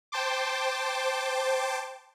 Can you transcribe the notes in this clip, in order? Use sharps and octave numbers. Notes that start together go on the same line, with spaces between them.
C5 G5 A5 C6 D6